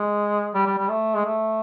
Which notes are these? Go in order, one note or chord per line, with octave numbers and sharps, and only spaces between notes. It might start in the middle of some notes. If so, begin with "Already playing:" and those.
Already playing: G#3
G3
G3
G3
A3
G#3
A3